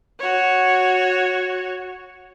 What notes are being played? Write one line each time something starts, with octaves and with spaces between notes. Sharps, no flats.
F#4 C#5